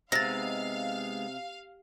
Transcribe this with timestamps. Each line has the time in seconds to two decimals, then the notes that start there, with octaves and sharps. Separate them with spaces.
0.12 C3 G#3 B3 D#4 F5 A6 A#6